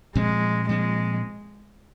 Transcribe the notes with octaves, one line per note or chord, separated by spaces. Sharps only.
A#2 F3 G#3 C4
A#2 F3 G#3 C4